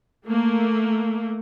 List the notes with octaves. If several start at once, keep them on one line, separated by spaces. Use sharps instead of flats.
A3 A#3